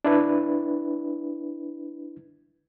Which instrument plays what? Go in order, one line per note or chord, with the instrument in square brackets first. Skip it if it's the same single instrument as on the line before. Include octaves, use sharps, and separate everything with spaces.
[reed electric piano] D4 E4 B4